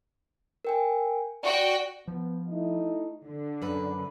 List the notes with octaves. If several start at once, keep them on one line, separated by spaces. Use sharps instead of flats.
A#4 G5 G#5
F#4 D5 G5
F3 B3
A3 D#4 E4
D3
F#2 B4